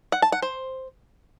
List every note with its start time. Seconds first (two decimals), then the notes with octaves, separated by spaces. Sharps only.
0.12 F#5
0.22 A5
0.32 F#5
0.42 C5